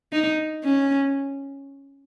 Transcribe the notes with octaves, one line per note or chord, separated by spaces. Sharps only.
D#4
C#4